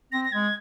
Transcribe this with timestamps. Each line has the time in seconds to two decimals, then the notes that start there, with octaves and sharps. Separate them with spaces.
0.12 C4 A#6
0.25 A#6
0.32 G#3 G#6